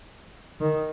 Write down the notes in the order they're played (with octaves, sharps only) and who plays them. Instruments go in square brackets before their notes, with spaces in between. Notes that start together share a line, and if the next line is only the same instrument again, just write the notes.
[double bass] D#3